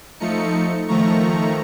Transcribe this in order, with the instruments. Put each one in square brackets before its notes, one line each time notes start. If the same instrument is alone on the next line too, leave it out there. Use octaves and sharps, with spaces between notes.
[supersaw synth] F3 A3 D#4 C#7
D#3 F3 A3 A#5 C#6